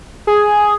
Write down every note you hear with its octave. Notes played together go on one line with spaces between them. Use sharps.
G#4